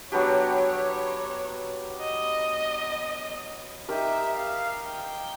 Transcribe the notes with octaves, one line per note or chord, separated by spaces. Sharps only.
F#3 B3 D4 G4 C#5
D#5
D#4 G4 A#4 D#5 E5
F5
G5